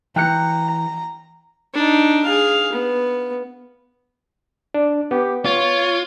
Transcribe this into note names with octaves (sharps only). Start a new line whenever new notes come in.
E3 G5 A#5 F#6 C#7
D4 D#4
G#4 F5
B3
D4
B3 G4
F4 C#5